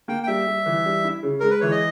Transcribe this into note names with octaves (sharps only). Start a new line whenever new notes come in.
A#3 G5
G5
G3 E5
G3
E3
G3
E4
C#3
G#3 A#4
B4
E3 C#5
D#5